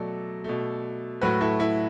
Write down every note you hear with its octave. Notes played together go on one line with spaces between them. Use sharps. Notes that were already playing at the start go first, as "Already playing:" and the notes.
Already playing: B2 F#3 A3 A4 D5
B2 A3
A2 F#3 A3 F#4 B4
E4 A4
E4 A4